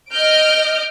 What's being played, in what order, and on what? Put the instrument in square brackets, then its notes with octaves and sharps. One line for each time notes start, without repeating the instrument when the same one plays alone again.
[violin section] D#5 F6 G6 D7